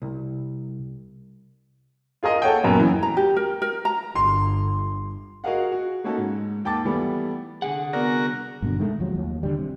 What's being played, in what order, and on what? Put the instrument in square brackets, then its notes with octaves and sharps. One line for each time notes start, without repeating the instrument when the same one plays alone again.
[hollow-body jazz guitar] C2
[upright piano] F4 G#4 A#4 D#5
A4 C#5 F#5 G5
D#1 F#2 B3 A#4
E3
[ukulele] A#5
G4
A#4
A#4
A#5
[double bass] G1 [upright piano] C6
[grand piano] F#4 G#4 A#4 D#5 F5 F#5
F#4
A3 A#3 C#4 D#4 F#4 A4
G#2
D#2 G5 A5 D6 A6
E3 G3 A3 B3
[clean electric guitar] C2 D3 F#5 [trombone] G#4
[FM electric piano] B3 D5 [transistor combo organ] F#4 A#4
[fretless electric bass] G2 B2 D3
D#3 G#3 A3
D#2 F3 F#3
D#2
D3 G3
C3